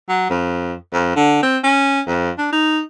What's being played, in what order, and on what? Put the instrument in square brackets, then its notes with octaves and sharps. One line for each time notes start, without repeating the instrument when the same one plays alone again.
[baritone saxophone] F#3
F2
F2
D3
C4
C#4
F2
D4
D#4